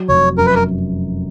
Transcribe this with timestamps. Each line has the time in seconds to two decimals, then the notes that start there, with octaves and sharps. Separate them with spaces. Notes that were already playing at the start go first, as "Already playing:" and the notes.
Already playing: F#3
0.09 F1 C#5
0.38 F#2 A#4
0.46 B4
0.55 A#4